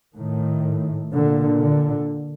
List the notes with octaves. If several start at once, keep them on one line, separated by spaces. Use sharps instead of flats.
A2 D#3
A#2 D3
D3